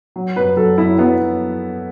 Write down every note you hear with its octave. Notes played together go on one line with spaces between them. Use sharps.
F#3
F#2 B4
F#3 A4
F#2 E4
F#3 B3